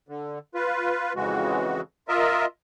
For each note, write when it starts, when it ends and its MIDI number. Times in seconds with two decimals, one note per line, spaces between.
0.08 0.39 50
0.55 1.13 65
0.55 1.13 71
1.16 1.81 41
1.16 1.81 49
1.16 1.81 52
1.16 1.81 56
1.16 1.81 66
2.08 2.46 65
2.08 2.46 70
2.08 2.46 75
2.08 2.46 76